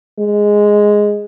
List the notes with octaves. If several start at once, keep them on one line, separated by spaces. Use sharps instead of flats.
G#3